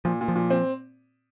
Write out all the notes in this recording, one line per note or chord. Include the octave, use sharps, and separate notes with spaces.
A#2 F3
A#2
F3
A#2
C4